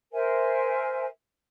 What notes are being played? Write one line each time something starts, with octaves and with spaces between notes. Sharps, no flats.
A#4 C5 E5 G#5